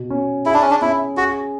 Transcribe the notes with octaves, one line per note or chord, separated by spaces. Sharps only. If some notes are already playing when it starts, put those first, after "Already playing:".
Already playing: B2
C#4
E4 G#4
D4
C#4
D4
C#4 E4
F#4 G#4